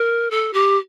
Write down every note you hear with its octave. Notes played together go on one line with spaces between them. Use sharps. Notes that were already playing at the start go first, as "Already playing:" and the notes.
Already playing: A#4
A4
G4